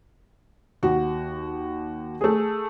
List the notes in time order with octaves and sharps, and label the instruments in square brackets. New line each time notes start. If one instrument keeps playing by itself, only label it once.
[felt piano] D#2 F#4
A3 G#4